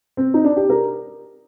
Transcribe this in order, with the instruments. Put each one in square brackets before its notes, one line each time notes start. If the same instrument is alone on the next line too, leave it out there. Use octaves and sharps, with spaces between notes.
[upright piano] C4
D#4
D4
G4
A#4